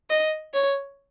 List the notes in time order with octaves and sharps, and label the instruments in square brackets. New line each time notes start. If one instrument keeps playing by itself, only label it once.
[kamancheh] D#5
C#5